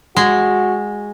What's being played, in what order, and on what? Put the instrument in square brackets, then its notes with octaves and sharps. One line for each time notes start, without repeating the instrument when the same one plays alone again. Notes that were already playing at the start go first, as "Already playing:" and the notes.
[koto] G#3 [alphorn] F#4